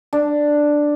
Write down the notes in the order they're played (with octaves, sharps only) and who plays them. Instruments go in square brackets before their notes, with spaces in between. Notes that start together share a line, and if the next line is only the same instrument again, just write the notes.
[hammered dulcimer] D4